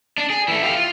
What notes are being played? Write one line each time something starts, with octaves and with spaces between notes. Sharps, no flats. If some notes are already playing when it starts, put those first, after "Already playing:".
D4
G#4
E3 A3
G4 F5
F4